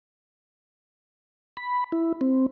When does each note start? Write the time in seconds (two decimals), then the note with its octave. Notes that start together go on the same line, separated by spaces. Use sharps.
1.57 B5
1.92 E4
2.21 C4